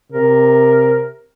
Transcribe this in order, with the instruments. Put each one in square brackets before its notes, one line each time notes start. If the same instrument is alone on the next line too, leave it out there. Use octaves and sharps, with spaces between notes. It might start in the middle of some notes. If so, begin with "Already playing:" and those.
[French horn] C3 [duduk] A#4